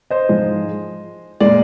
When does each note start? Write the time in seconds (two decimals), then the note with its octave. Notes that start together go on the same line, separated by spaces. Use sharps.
0.10 C5 D#5
0.29 G#2 F3 G#3
1.40 A#2 G#3 D5